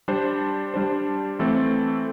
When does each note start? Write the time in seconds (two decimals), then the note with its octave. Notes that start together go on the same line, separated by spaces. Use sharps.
0.08 G3 D4 C5
0.74 G3 D4 C5
1.39 E3 A3 C4 A4